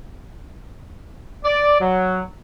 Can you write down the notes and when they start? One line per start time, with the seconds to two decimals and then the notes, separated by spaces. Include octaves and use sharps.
1.45 D5
1.80 F#3